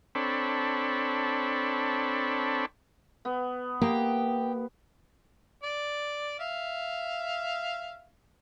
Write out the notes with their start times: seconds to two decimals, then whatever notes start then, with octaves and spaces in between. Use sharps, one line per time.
0.15 C4 D4 A4 C#5 B5
3.25 B3
3.82 A#3 G4
5.64 D5
6.39 E5 F5